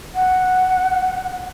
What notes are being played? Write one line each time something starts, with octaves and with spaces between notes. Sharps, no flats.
F#5